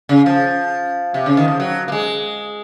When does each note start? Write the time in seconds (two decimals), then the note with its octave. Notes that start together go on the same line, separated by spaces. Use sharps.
0.09 C#3
0.26 F3
1.14 C3
1.26 C#3
1.37 D#3
1.48 F3
1.60 F#3
1.88 A#3
1.92 G#3